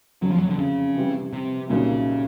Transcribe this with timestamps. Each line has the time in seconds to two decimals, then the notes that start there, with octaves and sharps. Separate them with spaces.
0.22 F#1 F2 D3 F#3
0.31 F3
0.40 F#3
0.50 D3
0.59 C#3
0.96 C3 E3 G3
1.33 C3
1.70 C2 A#2 C#3 F#3 A#3 D#4